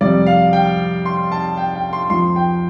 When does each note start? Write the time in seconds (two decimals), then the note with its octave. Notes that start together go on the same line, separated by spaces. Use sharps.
0.01 F2 C3 G3 D5
0.26 F5
0.53 G5
1.05 C6
1.32 A5
1.57 G5
1.75 G5
1.93 C6
2.10 F2 F3 C6
2.36 G5